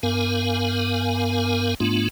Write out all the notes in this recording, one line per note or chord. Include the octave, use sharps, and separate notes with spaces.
G2 B3 A#4 F5 G#5
G#2 A3 B3 D4 F4